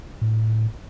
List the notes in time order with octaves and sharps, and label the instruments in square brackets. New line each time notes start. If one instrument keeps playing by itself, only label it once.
[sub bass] A2